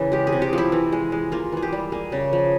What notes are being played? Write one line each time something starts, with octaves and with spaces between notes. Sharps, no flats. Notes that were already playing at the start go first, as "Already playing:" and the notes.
Already playing: C#3 E3 A#3
G#3 G4
G#4
C3
G4
F3 E4
E3
G#3
G#3
A#3 F4
E3 G#4
G4
G3
A#3 G#4
C#3
F3